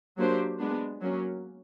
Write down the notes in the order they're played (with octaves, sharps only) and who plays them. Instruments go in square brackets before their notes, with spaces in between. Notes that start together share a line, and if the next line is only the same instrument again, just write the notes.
[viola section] F#3 A#3 D4 G4 C5
G#3 B3 D4
F#3 A#3 C#4